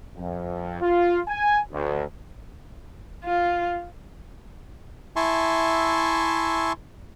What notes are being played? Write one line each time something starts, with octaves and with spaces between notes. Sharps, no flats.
F2
F4
G#5
D2
F4
E4 E5 G#5 A5 C6 C#6